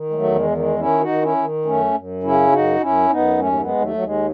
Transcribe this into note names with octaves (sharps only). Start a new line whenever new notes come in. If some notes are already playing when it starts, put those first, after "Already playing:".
Already playing: D#3
G#3
F#3 A3
E2
G#3
D#3
G#3
D#3 C#4 E4
D#4 F#4
D#3
C#4 E4
D#3
F#2 A3 C#4
F#2
C#3 C#4 E4
F#2 D#4 F#4
F#2 C#4 E4
F#2 B3 D#4
D#2 A3 C#4
A3
G#3 B3
D#2
F#3 A3
D#2 F#3
G#3